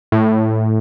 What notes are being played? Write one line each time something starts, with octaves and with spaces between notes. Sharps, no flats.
A2